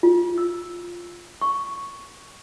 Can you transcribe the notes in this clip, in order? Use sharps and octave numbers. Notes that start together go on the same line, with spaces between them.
F4
E6
C#6